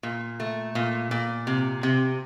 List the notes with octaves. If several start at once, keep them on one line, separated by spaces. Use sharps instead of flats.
A#2
A3
A#2
A#2
C3
C3